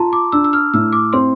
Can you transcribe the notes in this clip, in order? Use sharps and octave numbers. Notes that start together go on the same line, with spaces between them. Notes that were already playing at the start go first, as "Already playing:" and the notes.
Already playing: F4 A5 A#5 C6
D6
D4 E6
E6
F6
A2 E6
D6
C4 C6